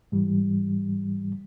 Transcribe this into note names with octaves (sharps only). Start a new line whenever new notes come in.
G#2 E3 G3